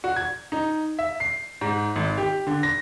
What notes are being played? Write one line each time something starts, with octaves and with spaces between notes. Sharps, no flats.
F#4
G#6
D#4
E5
C7
G#2
G#1
G4
D3
A#6